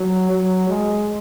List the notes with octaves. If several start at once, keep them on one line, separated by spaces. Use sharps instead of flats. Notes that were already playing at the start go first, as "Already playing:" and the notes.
Already playing: F#3
F#3
G#3